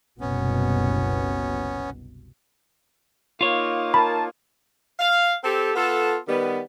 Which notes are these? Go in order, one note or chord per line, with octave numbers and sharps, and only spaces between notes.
F#1 C2 B2 B3 C#4
A#3 D#4 F4 C#5
A#4 A5 B5
F5
C4 G4 A4
B3 F4 A4
D#3 G3 B3